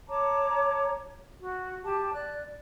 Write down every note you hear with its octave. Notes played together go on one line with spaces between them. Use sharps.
C#5 A5 A#5 D6
F#4
G4 A5
D5 F#6